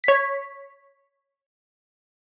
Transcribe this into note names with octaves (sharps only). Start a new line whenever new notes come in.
C#5 B6